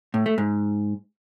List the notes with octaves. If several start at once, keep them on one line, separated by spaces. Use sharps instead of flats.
A2
A3
G#2